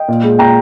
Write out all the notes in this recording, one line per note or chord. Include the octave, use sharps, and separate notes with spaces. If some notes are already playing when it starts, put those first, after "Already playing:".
Already playing: D#5 G5
A#2
G#3
A#2 G5 A#5